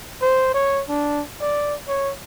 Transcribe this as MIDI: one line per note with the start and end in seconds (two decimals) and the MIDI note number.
0.22 0.51 72
0.54 0.82 73
0.89 1.22 62
1.41 1.75 74
1.88 2.12 73